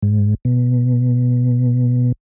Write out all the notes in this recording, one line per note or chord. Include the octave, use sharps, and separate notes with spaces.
G#2
B2